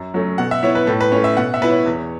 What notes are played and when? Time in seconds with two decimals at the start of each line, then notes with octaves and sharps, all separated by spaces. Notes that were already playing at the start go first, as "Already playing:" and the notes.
Already playing: F#2
0.14 F#3 A3 C#4
0.38 B2 F#5
0.51 E5
0.63 B3 E4 C#5
0.75 B4
0.87 A2 A4
1.01 B4
1.12 A3 C#4 C#5
1.24 E5
1.37 B2 F#5
1.54 E5
1.61 B3 E4 B4
1.70 C#5
1.86 E2